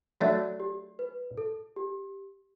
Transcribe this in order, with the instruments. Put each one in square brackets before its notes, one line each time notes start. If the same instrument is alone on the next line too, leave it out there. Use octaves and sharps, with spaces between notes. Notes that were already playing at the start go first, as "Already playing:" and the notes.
[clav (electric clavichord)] F#3 A3 D4 [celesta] F#4
[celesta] G4
B4
A4
G4